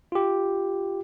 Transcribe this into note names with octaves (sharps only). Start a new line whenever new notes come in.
F4 G4